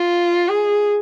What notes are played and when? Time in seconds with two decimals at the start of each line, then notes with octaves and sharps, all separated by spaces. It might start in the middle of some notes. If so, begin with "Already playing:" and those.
Already playing: F4
0.48 G#4